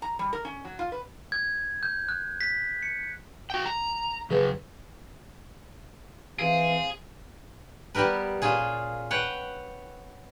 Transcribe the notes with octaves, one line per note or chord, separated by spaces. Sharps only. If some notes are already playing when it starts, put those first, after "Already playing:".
A#5
G3
A#4
C#4
F#3
F4
B4
G#6
G6
F#6
B6
C#7
F#4 G5
A#5
C#3 F#3 G#4 B4
E3 C4 G#4 F5
G3 B3 G4 A#4 B4
A#2 C#4 F4 G#4
B4 C#5 F#5 G5